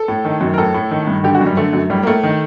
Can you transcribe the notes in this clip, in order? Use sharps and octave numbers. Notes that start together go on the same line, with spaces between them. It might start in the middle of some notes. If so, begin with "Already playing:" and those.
Already playing: A4
A2
D#3
F#2
A#4
A2 A4
A2
D#3
G2
D3 G4
F#4
F#2
G3
D3 A3
F#2
A2 G3
A#3
A2 A3
D#3